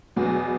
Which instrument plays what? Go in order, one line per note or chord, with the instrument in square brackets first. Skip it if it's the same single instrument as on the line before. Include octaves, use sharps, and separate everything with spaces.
[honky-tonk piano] E2 B2 F#3 B3